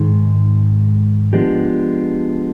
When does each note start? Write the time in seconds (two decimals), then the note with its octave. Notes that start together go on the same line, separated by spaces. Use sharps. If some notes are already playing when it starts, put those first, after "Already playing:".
Already playing: G#2 D#3 G#3
1.33 F3 G#3 B3 D4 G4